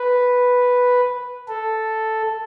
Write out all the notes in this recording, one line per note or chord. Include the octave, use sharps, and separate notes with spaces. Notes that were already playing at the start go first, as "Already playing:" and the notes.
Already playing: B4
A4